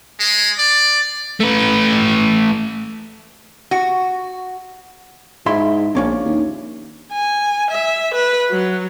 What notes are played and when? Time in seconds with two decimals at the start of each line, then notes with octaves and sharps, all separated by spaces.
0.19 G#3
0.58 D5
1.40 A3 B4
3.71 F#4
5.46 G#2 E4 E5 C6
5.95 A#1 A#3 C#4 D4
6.26 D#2
7.12 G#5
7.71 E5
8.14 B4
8.51 F#3